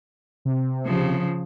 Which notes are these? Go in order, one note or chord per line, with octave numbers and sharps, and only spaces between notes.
C3
C#3 F3